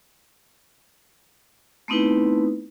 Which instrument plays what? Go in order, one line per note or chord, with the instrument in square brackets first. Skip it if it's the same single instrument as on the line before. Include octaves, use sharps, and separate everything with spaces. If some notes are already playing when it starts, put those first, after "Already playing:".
[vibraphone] A3 B3 C4 D#4 E4 B4